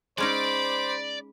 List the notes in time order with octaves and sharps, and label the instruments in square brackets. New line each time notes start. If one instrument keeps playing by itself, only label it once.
[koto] G#3 C#4 D#4 [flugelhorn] C5 [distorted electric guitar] D5 [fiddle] B5 D6